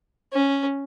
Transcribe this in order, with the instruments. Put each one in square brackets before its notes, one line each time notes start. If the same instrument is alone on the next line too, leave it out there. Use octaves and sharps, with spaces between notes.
[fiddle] C#4